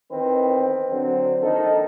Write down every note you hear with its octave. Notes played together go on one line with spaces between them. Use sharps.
E2 D#3 C4 B4
D3 F#3 C4
A#1 D#3 D#4 A4